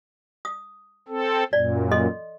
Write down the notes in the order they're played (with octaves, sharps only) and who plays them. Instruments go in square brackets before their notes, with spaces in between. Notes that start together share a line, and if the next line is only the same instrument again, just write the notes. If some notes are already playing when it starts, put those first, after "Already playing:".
[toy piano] D#6
[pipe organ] C4 A4
[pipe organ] F#2 A#2 [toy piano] D5
[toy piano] A4 D#5 C6